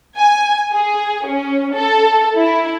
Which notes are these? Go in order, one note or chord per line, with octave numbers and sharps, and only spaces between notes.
G#5
G#4
C#4
A4
E4